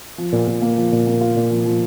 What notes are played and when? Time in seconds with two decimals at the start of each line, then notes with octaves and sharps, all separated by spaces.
0.18 F3
0.32 A#2
0.47 A#2
0.62 A#3
0.77 F3
0.92 A#2
1.07 A#3
1.21 F4
1.36 A#2
1.51 F3
1.65 F3